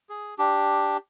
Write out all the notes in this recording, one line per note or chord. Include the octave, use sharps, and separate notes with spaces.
G#4
D4 G4